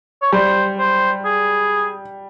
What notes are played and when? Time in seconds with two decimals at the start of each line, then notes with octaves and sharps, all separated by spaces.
0.22 C#5
0.33 G3 C5
0.78 C5
1.25 G#4